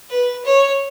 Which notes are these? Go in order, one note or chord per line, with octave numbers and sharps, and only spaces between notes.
B4
C#5